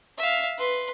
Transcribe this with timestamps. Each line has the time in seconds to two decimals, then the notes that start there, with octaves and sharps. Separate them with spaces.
0.18 E5 F5
0.58 B4 C6